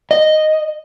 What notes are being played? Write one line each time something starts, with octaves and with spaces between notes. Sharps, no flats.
D#5